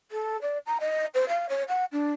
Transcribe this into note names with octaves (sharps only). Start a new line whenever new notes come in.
A4
D5
A#5
D#5
C5
F5
C#5
F#5
D4